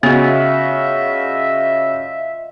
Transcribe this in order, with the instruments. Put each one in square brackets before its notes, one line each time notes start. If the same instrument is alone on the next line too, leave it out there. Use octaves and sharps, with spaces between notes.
[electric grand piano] C#3 F#4 [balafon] B3 [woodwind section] F4 D#5 E5